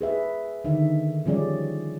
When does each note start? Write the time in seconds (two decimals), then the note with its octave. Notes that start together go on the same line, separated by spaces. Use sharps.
0.01 G#4 B4 E5
0.64 D3 D#3 D#4 E5
1.26 F3 G3 C#4 G#4 D5